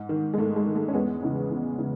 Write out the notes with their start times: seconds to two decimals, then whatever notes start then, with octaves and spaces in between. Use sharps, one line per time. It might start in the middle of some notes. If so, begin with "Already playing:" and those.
Already playing: G#2
0.09 D#3
0.34 G#3
0.38 G#2 A3
0.56 G#3
0.66 D#3
0.76 A3
0.88 C#4
0.93 E2 G#3 B3
1.22 C#3 E3
1.50 E2
1.78 C#3 E3